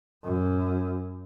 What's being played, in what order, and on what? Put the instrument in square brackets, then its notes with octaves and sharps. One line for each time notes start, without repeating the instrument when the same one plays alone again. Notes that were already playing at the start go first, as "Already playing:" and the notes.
[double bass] F#2